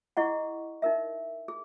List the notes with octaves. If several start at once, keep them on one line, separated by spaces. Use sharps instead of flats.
E4 G#4 D#5 F#5 C#6
D#4 A#4 E5
G#4